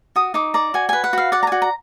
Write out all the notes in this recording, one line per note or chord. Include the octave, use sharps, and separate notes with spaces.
F#4 D#6
D#4 D6
D5 A#5
F#4 G#5
B4 G#5
F#5
F#4 F5
D5 F#5
A#5
F#4 G#5
A#5